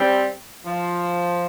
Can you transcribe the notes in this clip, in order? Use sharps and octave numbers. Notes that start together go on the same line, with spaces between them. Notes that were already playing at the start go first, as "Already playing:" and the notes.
Already playing: G3 C4
F3